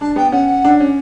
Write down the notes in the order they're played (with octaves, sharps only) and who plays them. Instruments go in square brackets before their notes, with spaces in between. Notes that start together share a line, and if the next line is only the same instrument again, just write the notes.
[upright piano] D4 [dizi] A5
[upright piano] B3 [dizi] G5
[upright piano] C#4 [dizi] F#5
[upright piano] D4
C#4